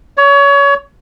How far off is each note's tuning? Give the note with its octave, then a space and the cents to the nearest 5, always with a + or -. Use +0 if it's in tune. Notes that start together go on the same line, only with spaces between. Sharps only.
C#5 +25